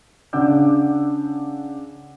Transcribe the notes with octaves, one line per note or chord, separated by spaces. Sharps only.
C#3 D4 F#5 D6 E6 G6